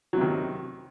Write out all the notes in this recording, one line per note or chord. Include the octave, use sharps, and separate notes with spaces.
C3 D#3 F#3